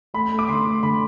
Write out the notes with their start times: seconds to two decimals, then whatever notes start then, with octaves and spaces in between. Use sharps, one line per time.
0.14 A3 B5
0.32 A3
0.39 D6
0.48 D3 C6
0.66 A3
0.83 D3 B5